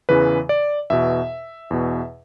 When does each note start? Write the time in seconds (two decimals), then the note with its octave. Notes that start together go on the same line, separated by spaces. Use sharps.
0.09 E2 C#3 E3 B4
0.49 D5
0.90 E2 B2 E5
1.71 E2 B2